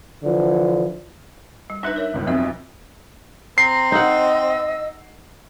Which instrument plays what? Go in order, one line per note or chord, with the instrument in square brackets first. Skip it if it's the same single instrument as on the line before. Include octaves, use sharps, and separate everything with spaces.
[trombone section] D3 E3 F3
[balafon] G3
[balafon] D4 D#4 B4 [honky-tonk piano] E5 F#6
[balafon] A#4 C#5
[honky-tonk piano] G1 C#2
[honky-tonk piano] B1 F2 [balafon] C4 E5
[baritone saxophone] C4 [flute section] A#5 [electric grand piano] C7
[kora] D#4 F#5 [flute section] D#5 E6